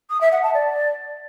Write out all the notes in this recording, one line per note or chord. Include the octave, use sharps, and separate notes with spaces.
D#6
E5
F#5
A5
D5